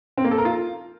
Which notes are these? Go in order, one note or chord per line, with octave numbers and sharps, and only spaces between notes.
C4
A#3
A4
A#4
F4